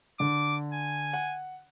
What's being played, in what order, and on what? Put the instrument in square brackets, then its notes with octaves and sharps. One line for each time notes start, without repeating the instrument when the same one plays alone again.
[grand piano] D3 [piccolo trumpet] D6
[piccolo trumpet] G#5
[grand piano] F#5